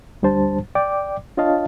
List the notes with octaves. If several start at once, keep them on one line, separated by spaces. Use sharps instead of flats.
D2 G3 D4 C5 A5
D5 G5 D6
D4 F4 C#5 D#5 F5 A5